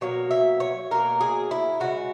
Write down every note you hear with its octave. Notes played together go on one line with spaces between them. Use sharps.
B2 F#3 A#3 C#5
E5
C#5
B2 F#3 A#3 A#4
G#4
E4
C#3 G#3 F#4